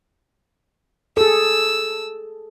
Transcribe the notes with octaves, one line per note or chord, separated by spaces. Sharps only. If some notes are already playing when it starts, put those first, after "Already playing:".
G#4 A4 E6